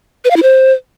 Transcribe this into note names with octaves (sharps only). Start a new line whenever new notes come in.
B4
F5
E4
C5